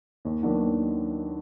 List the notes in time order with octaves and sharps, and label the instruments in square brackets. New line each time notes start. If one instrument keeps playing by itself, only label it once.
[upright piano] D#2
D#3 F#3 B3 D4
D#2